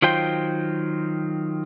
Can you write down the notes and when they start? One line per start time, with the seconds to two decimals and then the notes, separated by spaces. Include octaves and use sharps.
0.02 D#3 F#3 F4 C5 G5